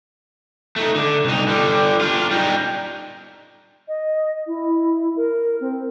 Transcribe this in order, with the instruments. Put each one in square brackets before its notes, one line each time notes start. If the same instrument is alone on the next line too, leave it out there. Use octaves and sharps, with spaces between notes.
[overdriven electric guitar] A3 D#4
D3
C2 D#4
D3 G3
D4 F4
G3 D#4
[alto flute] D#5
E4
A#4
C4